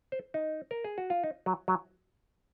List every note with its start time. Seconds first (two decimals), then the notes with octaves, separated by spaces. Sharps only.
0.12 C5
0.34 D#4
0.71 A#4
0.84 G#4
0.98 F#4
1.10 F4
1.24 D#4
1.46 F#3
1.68 F#3